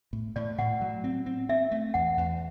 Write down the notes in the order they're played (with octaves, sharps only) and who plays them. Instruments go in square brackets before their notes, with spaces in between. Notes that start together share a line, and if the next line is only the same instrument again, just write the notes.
[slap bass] A2
[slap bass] A2 [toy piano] D5
[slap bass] A2 [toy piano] F#5
[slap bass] F#3
C4
C4
[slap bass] C4 [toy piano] E5
[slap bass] A3
[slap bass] E2 [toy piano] F#5
[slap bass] E2